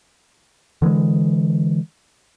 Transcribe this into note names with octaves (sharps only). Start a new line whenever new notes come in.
D3 E3 G3 G#3